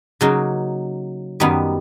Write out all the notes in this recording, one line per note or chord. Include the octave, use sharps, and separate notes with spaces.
C#3 F#3 A#3 D#4
F#2 D#3 G3 B3 D#4